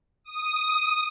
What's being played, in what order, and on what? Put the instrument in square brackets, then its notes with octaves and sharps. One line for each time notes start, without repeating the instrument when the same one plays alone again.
[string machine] D#6